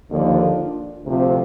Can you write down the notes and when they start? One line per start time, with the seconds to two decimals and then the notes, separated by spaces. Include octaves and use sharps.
0.11 D#2 D3 F3 D4 F4
1.05 D2 C3 F3